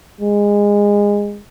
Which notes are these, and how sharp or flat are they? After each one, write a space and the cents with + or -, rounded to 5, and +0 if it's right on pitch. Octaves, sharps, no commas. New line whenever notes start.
G#3 -20